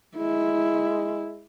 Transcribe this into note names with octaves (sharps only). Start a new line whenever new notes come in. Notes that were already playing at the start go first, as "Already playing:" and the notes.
G#3 E4